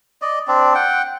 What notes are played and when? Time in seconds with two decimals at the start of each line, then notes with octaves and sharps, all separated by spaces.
0.22 D5 D#5
0.48 C4 D4 D5
0.74 F#5 G5